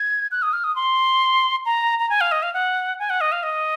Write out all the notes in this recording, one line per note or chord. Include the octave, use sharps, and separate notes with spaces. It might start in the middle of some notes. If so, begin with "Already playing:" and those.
Already playing: G#6
F#6
D#6
F6
D#6
C6
A#5
A#5
G#5
F5
D#5
F5
F#5
G#5
F#5
D#5
F5
D#5